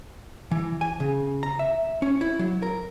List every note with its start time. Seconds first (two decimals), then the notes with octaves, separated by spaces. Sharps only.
0.51 E3
0.81 G#5
1.00 C#3
1.43 A#5
1.59 E5
2.02 C#4
2.21 E4
2.39 F#3
2.62 A#4